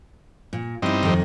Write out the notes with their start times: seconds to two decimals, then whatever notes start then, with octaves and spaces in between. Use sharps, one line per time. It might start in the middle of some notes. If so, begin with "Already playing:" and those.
0.53 A#2
0.82 G2 B3 C4 D#4 E4
1.03 F2 D#3